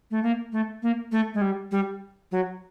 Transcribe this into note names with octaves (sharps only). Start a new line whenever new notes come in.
A3
A#3
A3
A#3
A3
G#3
G3
G3
F#3